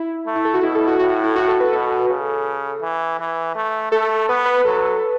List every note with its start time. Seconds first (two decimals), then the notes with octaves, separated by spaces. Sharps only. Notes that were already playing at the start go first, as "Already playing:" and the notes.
Already playing: E4
0.27 A3
0.35 E4
0.45 A4
0.54 F#4
0.63 B2 E4
0.75 A4
0.87 F#4
0.99 A2 F#4
1.11 F#4
1.24 E4
1.36 F#4
1.48 A4
1.60 B4
1.73 B2 A4
2.09 C#3
2.82 E3
3.19 E3
3.55 A3
3.92 A3 A4
4.29 B3 B4
4.45 B4
4.65 F#3 A4